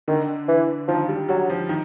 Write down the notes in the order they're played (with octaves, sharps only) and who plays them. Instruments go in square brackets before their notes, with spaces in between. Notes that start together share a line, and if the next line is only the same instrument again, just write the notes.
[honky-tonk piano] D3 [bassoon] D#3
[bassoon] E3
[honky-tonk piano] D#3 [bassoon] F3
[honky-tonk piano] G3
[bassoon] F#3 [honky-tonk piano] G3
[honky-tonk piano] F3
D#3